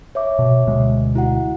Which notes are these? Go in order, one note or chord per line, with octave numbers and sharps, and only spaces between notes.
C#5 E5 D6
B2
D2 B2 G#3
E4 F#4 F#5